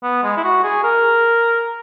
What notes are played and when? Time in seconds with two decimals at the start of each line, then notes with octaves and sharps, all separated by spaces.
0.03 B3
0.23 G#3
0.37 E4
0.44 F#4
0.63 G#4
0.84 A#4